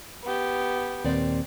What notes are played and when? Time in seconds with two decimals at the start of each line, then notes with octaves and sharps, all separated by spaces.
0.24 B3 G4
1.04 D#2 A#2 C4 D5